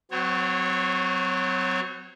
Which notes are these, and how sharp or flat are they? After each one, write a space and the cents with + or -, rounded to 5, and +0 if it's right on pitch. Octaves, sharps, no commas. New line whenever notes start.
F#3 +0 C4 -35 C#5 -25